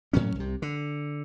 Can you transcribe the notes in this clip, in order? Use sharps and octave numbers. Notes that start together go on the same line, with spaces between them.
A2 F#3 C#4
C2 C3
D3